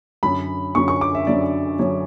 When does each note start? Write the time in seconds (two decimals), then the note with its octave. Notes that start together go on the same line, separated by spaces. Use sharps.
0.23 F#2 D3 F#3 B5
0.75 F#2 D3 F#3 C#6
0.88 C#6
1.01 D6
1.15 E5
1.27 F#2 D3 F#3 D5
1.79 F#2 D3 F#3 C#5